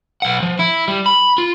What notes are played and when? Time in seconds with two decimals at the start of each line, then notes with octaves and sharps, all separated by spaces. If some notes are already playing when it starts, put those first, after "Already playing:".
0.22 B1 F#5
0.43 F3
0.59 E4
0.88 G3
1.06 B5
1.38 F4